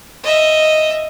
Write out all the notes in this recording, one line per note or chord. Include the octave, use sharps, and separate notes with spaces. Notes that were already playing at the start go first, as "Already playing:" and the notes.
D#5 E5